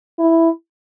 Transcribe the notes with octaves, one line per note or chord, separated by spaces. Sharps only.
E4